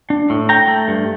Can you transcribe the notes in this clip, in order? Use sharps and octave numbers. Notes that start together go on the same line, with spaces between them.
D4
A2
A3 G5 A#5
A3
G2